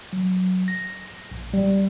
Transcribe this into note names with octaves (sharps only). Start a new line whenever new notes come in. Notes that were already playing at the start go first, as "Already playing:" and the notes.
F#3
A#6
A#1
G3